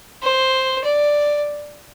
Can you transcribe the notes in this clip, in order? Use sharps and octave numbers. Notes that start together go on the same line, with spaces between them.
C5
D5